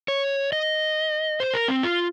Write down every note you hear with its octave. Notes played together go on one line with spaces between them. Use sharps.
C#5
D#5
C5
A#4
C4
F4